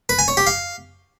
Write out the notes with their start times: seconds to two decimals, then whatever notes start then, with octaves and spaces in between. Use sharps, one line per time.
0.09 B4
0.19 G#5
0.28 C#5
0.37 G4
0.47 F5